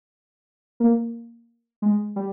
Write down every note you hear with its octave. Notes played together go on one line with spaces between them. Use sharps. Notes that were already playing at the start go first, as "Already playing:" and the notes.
A#3
G#3
G3